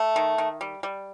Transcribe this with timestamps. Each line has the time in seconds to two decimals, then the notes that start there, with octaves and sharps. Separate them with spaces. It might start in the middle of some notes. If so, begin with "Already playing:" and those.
Already playing: A3
0.16 D#3
0.38 D#3
0.61 G3
0.83 G3